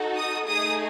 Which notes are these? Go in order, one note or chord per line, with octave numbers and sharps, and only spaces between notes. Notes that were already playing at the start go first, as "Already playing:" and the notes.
Already playing: D#4 F#4 A4
D#6
A3 D#4 G#4 D#6